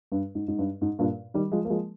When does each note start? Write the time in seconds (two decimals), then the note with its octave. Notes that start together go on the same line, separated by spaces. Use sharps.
0.12 G2
0.35 G#2
0.48 G#2
0.59 G2
0.81 G#2
0.99 G2 A#2
1.34 D#3 G3
1.52 F3 G#3
1.65 A#3
1.70 F3 G#3